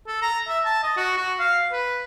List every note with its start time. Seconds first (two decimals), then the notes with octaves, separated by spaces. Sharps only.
0.08 A4
0.22 A#5
0.48 E5
0.65 A5
0.83 D#5
0.97 F#4
1.17 F#4
1.39 F5
1.72 B4